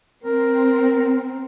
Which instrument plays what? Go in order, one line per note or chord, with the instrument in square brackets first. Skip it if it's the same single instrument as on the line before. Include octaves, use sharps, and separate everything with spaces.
[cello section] C4 [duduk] A#4